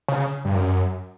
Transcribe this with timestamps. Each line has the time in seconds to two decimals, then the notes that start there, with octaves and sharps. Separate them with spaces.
0.08 C#3
0.45 G2
0.54 F#2